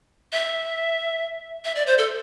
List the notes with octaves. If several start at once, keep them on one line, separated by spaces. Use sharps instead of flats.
E5
E5
D5
C5
A4